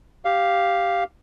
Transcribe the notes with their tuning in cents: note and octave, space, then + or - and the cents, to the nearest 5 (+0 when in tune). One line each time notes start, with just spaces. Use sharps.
G4 +0 F5 +0